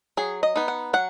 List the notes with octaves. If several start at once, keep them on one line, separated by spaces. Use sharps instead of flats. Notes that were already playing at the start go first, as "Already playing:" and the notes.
F#3 G#4
D#5
B3 D#4
F#5
F#3 F#5